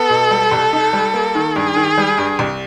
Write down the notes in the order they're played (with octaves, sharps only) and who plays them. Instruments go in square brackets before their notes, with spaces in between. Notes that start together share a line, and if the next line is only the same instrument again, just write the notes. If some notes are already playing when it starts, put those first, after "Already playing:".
Already playing: [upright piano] B3 [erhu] A4
[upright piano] B2
G3
C2
D#4
G3
A#3
D#3
[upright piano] G2 [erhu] G#4
[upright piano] D#3
G3
G2
C2